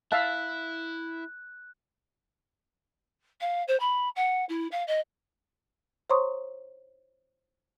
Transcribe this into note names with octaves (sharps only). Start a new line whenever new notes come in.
E4 E5 F5 A5 F#6
F5
C5
B5
F#5
E4
F5
D#5
C5 C#5 A#5 C6 C#6 D#6